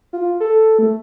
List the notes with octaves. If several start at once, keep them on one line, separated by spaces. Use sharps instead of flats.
F4
A4
A3